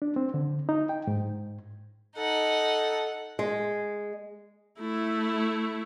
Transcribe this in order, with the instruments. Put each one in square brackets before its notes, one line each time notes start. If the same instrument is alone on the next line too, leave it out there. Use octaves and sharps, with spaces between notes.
[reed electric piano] D4
C4
D3
D#4
G5
G#2
[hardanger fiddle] D#4 F#5 [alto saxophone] A4
[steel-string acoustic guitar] G#3
[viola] A3 E4